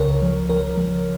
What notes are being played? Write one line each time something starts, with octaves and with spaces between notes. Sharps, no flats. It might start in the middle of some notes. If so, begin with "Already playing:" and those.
Already playing: C#2 C#3 A#4 C#5
F3
F3 A#4
F3